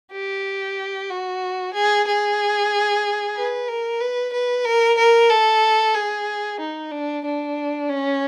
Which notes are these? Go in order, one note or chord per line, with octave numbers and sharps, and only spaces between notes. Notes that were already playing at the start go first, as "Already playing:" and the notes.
G4
F#4
G#4
G#4
B4
A#4
B4
B4
A#4
A#4
A4
G#4
D#4
D4
D4
C#4